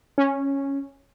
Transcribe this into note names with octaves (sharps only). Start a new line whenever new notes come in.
C#4